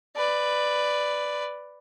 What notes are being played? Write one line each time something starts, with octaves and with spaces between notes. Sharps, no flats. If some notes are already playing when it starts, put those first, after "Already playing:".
B4 D5